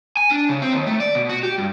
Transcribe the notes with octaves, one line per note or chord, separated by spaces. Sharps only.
G#5
D4
C#3
C4
D#2
A3
D5
B2
F#4
G4
G2